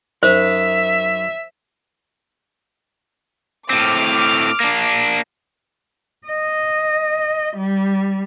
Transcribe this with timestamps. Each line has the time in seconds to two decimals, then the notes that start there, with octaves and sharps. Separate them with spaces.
0.23 F#2 D#4 C5 E5
3.70 A2 C4 D6 F6
4.60 A#3 D4
6.27 D#5
7.57 G3